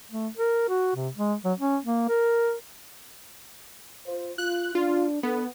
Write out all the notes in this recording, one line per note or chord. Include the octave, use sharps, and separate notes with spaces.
A3
A#4
F#4
C3
G#3
F#3
C#4
A#3
A#4
F4 C5
F4 F#6
D4 F4
B3 D4 A4